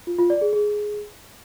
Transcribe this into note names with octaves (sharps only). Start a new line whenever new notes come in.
F4
F4
D5
G#4
G#4